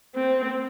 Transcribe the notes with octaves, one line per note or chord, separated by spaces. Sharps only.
C4